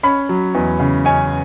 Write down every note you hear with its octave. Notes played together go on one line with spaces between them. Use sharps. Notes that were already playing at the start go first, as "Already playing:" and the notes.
C#4 B5
F#3
E2
C#3
C#4 G#5